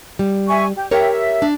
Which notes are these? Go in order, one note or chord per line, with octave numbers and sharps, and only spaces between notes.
G3
E5 G#5 C#6
G4
G4 A#4 C#5 E5 G5
E5
D4